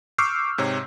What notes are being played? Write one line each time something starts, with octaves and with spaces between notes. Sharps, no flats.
C#6 D6 E6 F6 G6 C7
G#2 C3 C#5